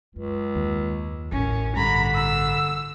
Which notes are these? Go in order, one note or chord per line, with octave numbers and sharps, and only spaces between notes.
C#2 F#2
D#2
A1 F#2 C#4
G2 D3 A#5 B5
E6